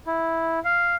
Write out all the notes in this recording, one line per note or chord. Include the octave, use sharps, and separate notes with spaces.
E4
F5